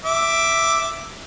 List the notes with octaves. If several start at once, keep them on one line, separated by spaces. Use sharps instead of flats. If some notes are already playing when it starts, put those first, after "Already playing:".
E5 D6